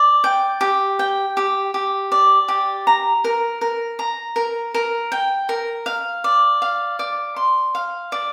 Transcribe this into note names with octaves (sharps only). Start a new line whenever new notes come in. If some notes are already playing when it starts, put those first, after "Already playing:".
Already playing: D5
G5
G4
G5
G4
G4
D5
G4
A#5
A#4
A#4
A#5
A#4
A#4
G5
A#4
F5
D5
F5
D5
C6
F5
D5